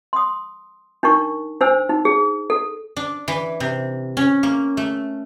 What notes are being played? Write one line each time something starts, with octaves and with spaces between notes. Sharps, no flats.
C6 D#6
D4 D#4 A#4 C#6
D4 C5 G#5 E6
D#4
G#4
A4
D4
E3
C3
C#4
A#3
A3